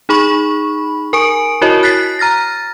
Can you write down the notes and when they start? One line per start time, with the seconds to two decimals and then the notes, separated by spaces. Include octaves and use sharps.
0.09 D#4 G#4 B5 C#6
1.13 A#4 G#5 C#6 D7
1.62 E4 F#4 A#4 C#5 D#5
1.83 F#6 A6 B6 C7
2.19 A#5 F6 A6 A#6